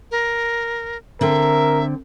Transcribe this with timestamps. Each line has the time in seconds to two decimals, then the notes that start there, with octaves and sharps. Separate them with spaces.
0.11 A#4
1.21 D3 C4 A#4 E5